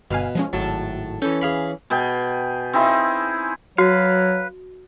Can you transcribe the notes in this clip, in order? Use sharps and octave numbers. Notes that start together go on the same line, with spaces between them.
G1 B2 F5 G#5
F3 G#3 C#4
G#1 A2 F#3 A5 A6
E3 C#4 A4 G6
G#4 F5 B5
B2 G#4 G5
C4 D#4 E4 G#4
F#3 F#4 B4 F5